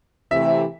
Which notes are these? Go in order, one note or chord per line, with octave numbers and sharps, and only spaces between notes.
C3 E3 A3 E5